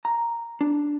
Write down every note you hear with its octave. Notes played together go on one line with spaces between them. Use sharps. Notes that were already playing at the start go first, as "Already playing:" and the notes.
A#5
D4